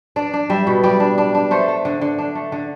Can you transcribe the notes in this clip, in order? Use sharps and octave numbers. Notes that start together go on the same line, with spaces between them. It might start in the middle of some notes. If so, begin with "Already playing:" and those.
D4 D5
D4
G3 E5
B2
G3 D5
D4
D4
D4
A3 C5
A3
D3
D3
D4
A3
D3